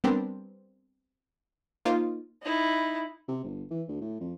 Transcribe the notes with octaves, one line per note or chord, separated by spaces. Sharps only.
G3 B3 C4 D4 G4 A#4
A#3 D#4 F4 C5
D#4 E4
C3
G1
E3
D2
A2
F2